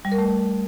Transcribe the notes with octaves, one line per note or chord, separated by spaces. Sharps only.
G3
A#4
A3